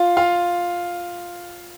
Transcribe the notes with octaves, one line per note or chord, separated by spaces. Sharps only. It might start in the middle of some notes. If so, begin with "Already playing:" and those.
Already playing: F4 F5
F4 F5